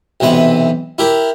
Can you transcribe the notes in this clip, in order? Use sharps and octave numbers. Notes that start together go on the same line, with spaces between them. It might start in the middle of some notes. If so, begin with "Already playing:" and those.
B1 C3 E3 B4
E4 G4 A#4